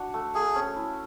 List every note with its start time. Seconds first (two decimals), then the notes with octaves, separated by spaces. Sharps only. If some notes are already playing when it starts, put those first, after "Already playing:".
Already playing: D4 F#4
0.14 A3
0.35 A3 G#4
0.56 C#4
0.76 E4